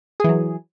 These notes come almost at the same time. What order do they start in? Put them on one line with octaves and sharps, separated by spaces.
G#4 E3 F#3